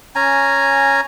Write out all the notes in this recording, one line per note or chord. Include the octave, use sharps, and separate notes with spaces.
C#4 G#5 A#5